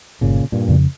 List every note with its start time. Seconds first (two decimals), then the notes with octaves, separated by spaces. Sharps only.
0.21 G1 A#2 C#3
0.52 G2 A#2
0.68 F2 C#3